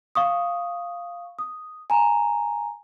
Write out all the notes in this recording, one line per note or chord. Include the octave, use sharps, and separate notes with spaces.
F5 C#6 D#6
D#6
G#5 A#5